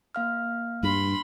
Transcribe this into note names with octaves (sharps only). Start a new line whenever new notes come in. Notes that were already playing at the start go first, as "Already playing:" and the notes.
A#3 F5 F6
G2 B5 C6